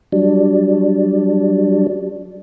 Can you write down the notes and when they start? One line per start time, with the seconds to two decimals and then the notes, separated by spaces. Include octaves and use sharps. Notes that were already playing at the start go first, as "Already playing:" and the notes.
0.12 F#3 G3 D4